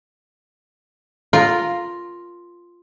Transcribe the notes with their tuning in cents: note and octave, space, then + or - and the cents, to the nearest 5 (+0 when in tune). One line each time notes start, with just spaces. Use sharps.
F4 +0 A#4 +0